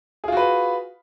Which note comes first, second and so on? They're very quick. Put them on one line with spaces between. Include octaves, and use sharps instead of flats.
G#4 F4 F#4 B4